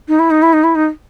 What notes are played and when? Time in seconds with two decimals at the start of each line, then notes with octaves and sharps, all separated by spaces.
0.08 D#4
0.19 E4
0.30 D#4
0.42 E4
0.53 D#4
0.64 E4
0.75 D#4